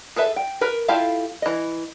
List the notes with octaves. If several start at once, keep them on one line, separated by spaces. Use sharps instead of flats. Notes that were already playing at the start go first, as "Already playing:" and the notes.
G#4 A4 B4 E5
G5
A#4 B4
E4 F4 G4 A4 F5
E3 D#5